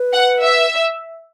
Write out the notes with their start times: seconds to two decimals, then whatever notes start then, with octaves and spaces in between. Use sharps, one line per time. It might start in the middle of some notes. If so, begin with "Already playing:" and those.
Already playing: B4
0.13 F#5
0.43 E5